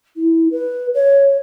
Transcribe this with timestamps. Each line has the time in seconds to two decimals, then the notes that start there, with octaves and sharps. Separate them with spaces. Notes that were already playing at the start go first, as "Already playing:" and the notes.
0.17 E4
0.51 B4
0.95 C#5